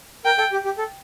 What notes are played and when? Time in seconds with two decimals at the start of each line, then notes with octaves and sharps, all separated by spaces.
0.25 A#4 G5
0.39 A4
0.52 G4
0.65 G4
0.78 A4